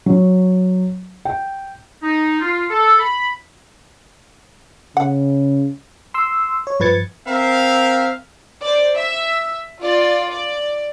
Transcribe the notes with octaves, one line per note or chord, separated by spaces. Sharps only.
F#3
G5
D#4
F4
A4
B5
C#3 F#5
C6 E6
C#5
G2 F3 B4 G#6 A6 C#7
C4 A#4 E5 F5
C5 D5
E5
F4 D5
D5